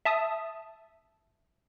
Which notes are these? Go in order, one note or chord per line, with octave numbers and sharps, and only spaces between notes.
E5 A5 D#6